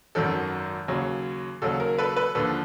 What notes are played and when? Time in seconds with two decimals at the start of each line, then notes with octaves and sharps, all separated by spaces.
0.15 G#1 F#2 D#3 F#3 A4
0.88 D#2 C#3 F#3
1.62 D#2 C#3 F#3 A4
1.80 A#4
1.98 A4 B4
2.16 A4 B4
2.35 D#2 D3 F3 A4 B4